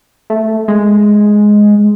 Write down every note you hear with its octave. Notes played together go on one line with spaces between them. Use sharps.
A3
G#3